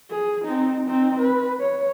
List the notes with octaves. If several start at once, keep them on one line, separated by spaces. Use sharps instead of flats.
G#4
C4 D#4
C4 D#4
B4
C#5